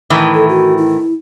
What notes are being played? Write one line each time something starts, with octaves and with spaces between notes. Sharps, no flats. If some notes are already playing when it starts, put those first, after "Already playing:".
A2 D#3 E3
A4
F#4
E4